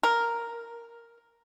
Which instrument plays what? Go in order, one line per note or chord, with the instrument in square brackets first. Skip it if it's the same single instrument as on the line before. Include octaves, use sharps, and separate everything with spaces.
[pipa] A#4